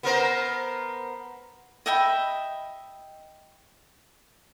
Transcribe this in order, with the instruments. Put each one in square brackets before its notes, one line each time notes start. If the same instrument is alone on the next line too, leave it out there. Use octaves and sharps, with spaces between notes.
[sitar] B3 A#4 C5
[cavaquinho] D#5 E5 G5 B5